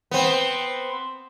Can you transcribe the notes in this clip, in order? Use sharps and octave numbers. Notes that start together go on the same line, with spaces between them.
B3 C4